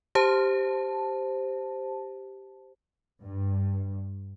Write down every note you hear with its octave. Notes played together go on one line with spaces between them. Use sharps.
G4 C5 A5
G2